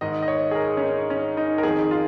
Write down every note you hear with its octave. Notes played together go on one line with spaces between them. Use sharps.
G#2 D#3 D#5
D#5
C#5
G#4
A#4
C#4
D#4
C#4
D#4
A#4
F2 D#3 G#4
F4